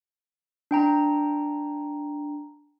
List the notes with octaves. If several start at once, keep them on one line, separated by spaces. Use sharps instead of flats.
D4 G5 A#5